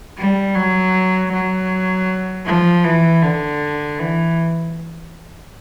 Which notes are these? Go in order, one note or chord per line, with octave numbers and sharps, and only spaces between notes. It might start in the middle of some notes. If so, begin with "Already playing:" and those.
G3
F#3
F#3
F3
E3
D3
E3